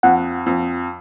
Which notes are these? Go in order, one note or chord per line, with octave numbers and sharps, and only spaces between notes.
F2 F#5
F2